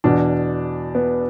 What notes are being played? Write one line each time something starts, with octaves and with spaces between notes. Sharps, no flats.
E2 B2 D4
B3